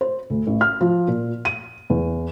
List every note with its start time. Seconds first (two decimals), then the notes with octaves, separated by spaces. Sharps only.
0.01 C5
0.30 D2
0.47 A1
0.61 F6
0.81 F3
1.08 A#2
1.45 D#7
1.90 E2